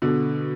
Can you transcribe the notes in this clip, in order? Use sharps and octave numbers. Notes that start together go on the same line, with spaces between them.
B2 D3